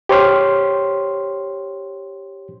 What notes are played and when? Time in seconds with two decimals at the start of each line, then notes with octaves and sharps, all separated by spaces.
0.09 G4 C5 C#5 C6 F6